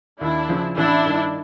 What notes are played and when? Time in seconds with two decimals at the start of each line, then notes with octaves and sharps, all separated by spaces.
0.20 D#2 D4 E4
0.49 C#3 F3
0.77 A1 D4 E4
1.06 G2 D#3